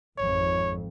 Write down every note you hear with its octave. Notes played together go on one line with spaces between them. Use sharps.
G#1 F2 C#5